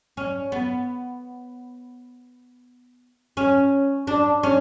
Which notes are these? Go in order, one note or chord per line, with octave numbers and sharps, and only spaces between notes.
C#4
B3
C#4
D4
C#4